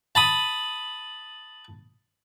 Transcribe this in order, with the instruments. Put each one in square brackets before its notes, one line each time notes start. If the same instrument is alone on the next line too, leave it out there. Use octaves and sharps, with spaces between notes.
[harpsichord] A5 B5 D#6